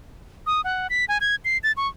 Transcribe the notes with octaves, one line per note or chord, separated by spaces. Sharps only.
D#6
F#5
B6
G#5
G#6
C7
A6
C#6